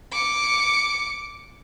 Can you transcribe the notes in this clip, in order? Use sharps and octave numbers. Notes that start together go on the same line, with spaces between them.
D6 C#7